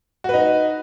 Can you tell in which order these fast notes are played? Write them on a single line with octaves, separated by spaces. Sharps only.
F#4 B4 D#4